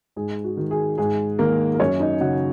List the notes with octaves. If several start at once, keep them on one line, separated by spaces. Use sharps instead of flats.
G#2 G#4
F#4
D#3
G#4
G#2 G#4
D#3 A#3 A#4
A#4
F#2 C#4 C#5
D#4 D#5
C#3 F#4 F#5